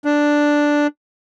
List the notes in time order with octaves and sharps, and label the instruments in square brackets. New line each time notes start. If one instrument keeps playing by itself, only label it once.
[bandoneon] D4